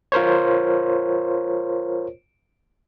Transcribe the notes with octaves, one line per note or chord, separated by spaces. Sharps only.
F4 A#4 C5 C#5